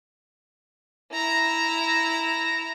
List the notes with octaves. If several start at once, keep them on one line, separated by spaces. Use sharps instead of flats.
E4 A#5